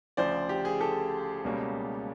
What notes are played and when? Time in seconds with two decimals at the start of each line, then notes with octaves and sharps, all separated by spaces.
0.17 D2 C#3 F3 C5 D5
0.49 G4
0.65 G#4
0.81 G4 A4
1.44 C#2 B2 G3 A#3 C#4